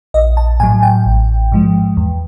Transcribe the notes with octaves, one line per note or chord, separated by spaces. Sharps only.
A#1 D#5
A5
A2 F#3 G#5
G5
A1
G#2 F3 G#3
E2